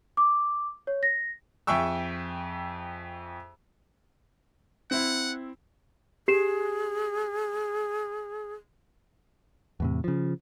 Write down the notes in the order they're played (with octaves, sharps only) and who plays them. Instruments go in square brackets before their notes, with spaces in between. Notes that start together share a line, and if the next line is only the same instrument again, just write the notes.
[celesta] D6
C#5
A#6
[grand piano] F2 G#4 E5 G5 C#6 E6
[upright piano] C4 E4 [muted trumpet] F#5
[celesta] G4 C7 E7 [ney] G#4
[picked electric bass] E2 A2 C3
C#3 F3